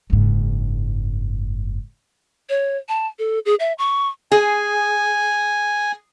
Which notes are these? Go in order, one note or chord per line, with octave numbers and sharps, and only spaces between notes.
F#1 G#2
C#5
A5
A4
G#4
E5
C#6
G#4 G#5